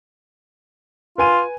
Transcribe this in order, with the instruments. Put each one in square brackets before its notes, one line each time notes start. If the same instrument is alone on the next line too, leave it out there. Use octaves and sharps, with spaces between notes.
[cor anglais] F4 [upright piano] B4 G#5 D#7